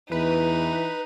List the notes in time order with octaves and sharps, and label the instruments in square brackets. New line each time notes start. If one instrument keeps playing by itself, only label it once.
[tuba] E2 [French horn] E3 [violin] D#4 [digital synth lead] B4